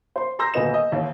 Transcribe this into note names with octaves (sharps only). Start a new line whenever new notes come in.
C5 C6
A#5 C6 E6 G6 A#6
D#1 D2 B3 D#5 E7
D#5
A1 D#2